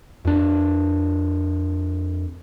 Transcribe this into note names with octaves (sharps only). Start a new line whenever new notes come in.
F2 D4